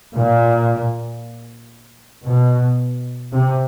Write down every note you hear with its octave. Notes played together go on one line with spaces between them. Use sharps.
A#2
B2
C3